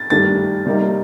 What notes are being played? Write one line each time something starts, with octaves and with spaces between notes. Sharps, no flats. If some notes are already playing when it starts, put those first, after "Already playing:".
Already playing: A6
G2 D#3 A3 D4 G4 A6
C3 G3 A#3 D#4 G4